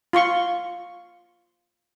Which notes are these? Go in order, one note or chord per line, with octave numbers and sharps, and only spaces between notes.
F4 C6 C#6